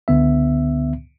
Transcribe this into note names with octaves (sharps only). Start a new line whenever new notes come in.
C#2 D3 B3 E5